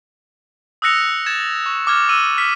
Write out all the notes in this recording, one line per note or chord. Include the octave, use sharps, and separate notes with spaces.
D#6 E6 F#6 A#6 C#7 F7
G#6 A6 E7
C#6
D6 F6 G#6
E6 D#7 F#7
F6 B6